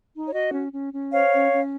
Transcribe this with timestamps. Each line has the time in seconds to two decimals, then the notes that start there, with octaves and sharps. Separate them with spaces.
0.12 D#4
0.25 C#5
0.32 F#4 D#5
0.52 C#4
0.72 C#4
0.92 C#4
1.12 C5 C#5 F5
1.32 C#4
1.52 C#4